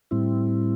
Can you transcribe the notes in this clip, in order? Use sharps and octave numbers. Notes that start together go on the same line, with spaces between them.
A2 G3 C4 E4